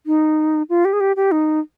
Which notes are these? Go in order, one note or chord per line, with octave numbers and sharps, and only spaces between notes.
D#4
F4
G4
G#4
G4
G4
D#4